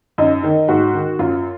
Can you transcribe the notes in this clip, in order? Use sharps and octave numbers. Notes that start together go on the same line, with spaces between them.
F#2 D#4
D#3
G#2 F#4
D#3
F#2 F4